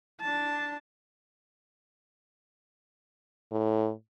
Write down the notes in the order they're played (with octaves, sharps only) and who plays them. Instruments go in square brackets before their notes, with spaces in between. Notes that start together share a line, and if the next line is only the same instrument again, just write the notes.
[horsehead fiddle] D4 A5
[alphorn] A2